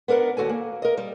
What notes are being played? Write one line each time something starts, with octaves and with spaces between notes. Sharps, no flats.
B3 D4 A#4 F#5
D#2 F#4 A4 G#5
A#3
A#4 D#5
G3